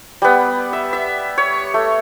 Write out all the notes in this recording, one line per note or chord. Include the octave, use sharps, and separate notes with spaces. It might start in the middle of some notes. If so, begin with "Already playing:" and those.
G3 B3
E5
E5
C#5
A3